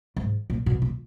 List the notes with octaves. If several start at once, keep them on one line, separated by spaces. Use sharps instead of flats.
G#2
A#2
B2
A#2